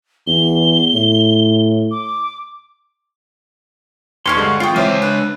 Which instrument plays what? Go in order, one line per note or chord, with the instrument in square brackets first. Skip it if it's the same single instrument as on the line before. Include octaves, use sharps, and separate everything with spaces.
[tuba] E2 [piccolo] G7
[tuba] A2
[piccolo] D6
[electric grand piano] D#2 C7 [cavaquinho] C#5 F5 C#6 [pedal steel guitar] C6
[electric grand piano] G2 D3 G#3 [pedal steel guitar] F#5
[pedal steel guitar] E3 C4 F5 [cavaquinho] F4 D#6 [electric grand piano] G5 C#6
[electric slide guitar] G#3 C#5 [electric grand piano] C5 E5 F6 [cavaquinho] D6
[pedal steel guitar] D4 [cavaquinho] B4